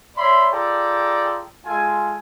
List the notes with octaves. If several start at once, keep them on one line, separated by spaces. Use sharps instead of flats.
C#5 D5 E5 B5 C6
F4 G#4 A4 D5 G5 A#5
G#3 F4 A4 G#5